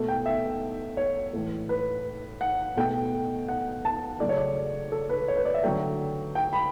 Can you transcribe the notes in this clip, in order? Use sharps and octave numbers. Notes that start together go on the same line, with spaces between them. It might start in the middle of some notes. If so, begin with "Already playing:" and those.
Already playing: B2 A3
G5
E5
C#5
A2 E3 A3
B4
F#5
B2 A3 G5
F#5
A5
C#3 F#3 A3 D5
C#5
D5
A4
B4
C#5
B4
D5
E5
D3 F#3 A3 G5
G5
B5